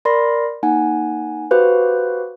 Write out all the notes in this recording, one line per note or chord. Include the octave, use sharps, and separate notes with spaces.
A#4 D5 B5 C6 A#6
A#3 D#4 F#5 G#5
F#4 G4 B4 C5 F5